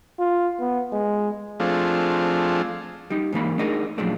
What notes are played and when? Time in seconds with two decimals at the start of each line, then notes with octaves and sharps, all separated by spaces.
0.19 F4
0.61 B3
0.92 G#3
1.60 F3 A3 C4 D4 F4 G#4
3.10 G3 D#4
3.32 G#2 E3 A#3 B5
3.58 A3 D4 D#4 G#4 A#4
3.98 F#2 A#2 F3 G#3 A3 D4